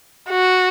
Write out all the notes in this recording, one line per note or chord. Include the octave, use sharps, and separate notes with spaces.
F#4